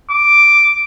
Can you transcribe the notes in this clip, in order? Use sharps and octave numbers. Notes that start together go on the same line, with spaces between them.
D6